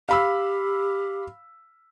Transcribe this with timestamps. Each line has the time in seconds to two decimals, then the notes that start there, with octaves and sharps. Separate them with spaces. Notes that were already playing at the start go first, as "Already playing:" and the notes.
0.09 G4 F5 B5 E6